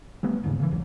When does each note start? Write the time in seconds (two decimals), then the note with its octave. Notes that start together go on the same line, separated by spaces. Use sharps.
0.23 G3 A3 B3
0.43 D#1 D#2 G#2 C#3
0.60 C#3 E3
0.71 E1 C2 F#3